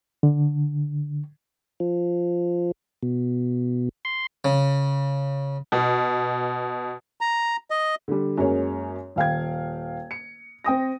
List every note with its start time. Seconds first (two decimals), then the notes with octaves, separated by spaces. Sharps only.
0.23 D3
1.80 F3
3.03 B2
4.05 C6
4.45 C#3
5.72 B2
7.21 A#5
7.70 D#5
8.08 D3 G3
8.38 F#2 G#3 A#3 C#5
9.16 D#1 F5 G5 G#6
10.11 C#7
10.64 C4 G5 D#6 A#6